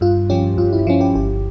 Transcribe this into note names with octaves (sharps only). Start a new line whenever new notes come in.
G2 F4
F3 C#4 G4
G2 F4
E4
F3 C#4 F4
G4
G1 G4